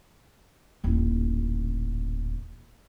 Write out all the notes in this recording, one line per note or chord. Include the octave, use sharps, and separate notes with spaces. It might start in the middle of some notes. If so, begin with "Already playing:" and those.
D#1 A1